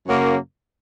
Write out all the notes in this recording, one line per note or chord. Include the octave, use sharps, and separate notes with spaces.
F#2 C#3 F#3 A#3